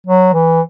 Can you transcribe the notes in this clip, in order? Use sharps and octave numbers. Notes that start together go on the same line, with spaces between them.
F#3
E3